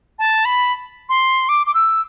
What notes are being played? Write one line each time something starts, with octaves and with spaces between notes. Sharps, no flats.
A5
B5
C6
D6
D6
E6